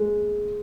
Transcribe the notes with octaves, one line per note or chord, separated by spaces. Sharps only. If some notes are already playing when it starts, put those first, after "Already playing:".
Already playing: G#3